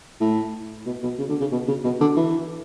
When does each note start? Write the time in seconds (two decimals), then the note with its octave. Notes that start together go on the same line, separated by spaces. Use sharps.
0.21 A2
0.86 B2
1.03 B2
1.19 C#3
1.29 D3
1.41 C#3
1.52 B2
1.68 C#3
1.84 B2
2.01 D3
2.16 E3